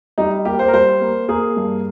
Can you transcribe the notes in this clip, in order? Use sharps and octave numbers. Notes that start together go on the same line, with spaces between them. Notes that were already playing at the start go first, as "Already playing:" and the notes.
G3 D#4
A#3 G4
C5
A#4
G3 C5
A#3
A#3 G#4
G2